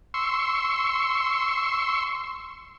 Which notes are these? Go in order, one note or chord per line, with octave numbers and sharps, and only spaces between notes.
C6 C#6 E6